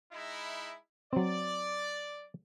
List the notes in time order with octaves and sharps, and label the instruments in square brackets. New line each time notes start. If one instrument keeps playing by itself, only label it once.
[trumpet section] G#3 D#4 E4
[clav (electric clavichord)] F#3 C4 [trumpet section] D5